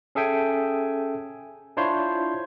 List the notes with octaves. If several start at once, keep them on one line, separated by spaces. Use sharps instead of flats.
C#4 G#4 A4 E5 G5 G#5
D4 E4 F4 C5 C#5 C6